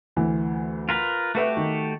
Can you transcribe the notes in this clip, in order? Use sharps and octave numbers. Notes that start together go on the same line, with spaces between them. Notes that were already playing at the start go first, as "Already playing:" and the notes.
D2 E3
F4 A#4 B4
A3 F#4 G4 A4 B4 E5
D#3